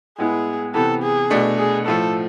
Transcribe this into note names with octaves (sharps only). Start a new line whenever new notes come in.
A2 G#3 B3 E4 G#4
C3 E3 B3 A4
G#4
B2 A3 D4
G#4
A2 F3 A3 A4